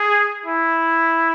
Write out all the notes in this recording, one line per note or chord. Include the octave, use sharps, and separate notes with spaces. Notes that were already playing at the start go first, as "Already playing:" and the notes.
Already playing: G#4
E4